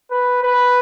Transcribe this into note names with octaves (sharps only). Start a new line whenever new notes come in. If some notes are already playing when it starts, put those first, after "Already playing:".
B4
B4